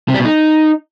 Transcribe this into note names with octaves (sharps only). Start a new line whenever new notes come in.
C3
G3
B2
D#4